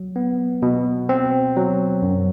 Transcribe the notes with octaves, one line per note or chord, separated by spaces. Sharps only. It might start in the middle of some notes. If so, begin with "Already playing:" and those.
Already playing: F#3
B3
B2
C4
F#3
F#2